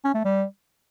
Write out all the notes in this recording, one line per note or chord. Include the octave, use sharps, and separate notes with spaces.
C#4
A3
G3